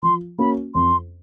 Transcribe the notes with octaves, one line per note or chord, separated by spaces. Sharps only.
F3 C6
A#3 C#4 F#4 B5
F2 C6